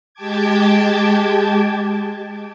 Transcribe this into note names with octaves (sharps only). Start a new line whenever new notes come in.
G#3 G4 G5 A5 D6 G#6